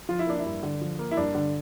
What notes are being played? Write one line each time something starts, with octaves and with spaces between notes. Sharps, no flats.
F3 F4
E4
A#3 D4
E4
G2
D3
F3
A#3
E4
G2 D4
D3